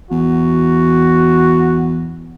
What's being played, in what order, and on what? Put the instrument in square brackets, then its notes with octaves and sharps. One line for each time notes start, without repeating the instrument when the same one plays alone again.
[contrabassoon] E2 [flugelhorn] F#4